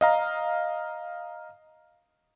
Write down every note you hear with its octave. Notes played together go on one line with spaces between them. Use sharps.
D#5 F5 A#5